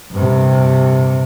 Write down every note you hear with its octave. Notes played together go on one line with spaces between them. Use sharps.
G2 C3